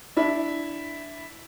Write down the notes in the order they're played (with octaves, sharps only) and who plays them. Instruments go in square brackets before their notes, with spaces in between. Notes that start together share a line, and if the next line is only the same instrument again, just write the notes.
[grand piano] D4 E4